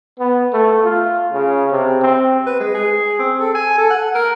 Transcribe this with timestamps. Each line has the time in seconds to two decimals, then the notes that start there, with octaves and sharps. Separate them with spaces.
0.19 B3
0.53 A3
0.84 F4
1.33 C#3
1.71 C3
2.01 C4
2.47 B4
2.60 G#3
2.74 G#4
3.19 C4
3.40 A4
3.55 G#5
3.78 A4
3.90 F#5
4.15 A#4